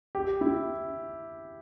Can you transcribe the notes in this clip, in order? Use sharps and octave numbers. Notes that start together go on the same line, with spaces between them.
G4
E4